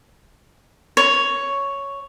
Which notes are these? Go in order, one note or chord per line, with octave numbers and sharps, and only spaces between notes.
C#5